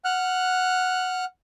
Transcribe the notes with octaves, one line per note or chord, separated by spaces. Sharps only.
F#5 F6 F#6